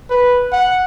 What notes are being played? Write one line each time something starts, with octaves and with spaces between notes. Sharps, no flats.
B4
F#5